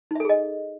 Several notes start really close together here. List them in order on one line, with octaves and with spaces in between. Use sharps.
D#4 E5 A4 G#4 D#5